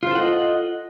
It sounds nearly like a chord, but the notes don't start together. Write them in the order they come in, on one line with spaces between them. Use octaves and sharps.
F4 C5 A4 F#5 D#5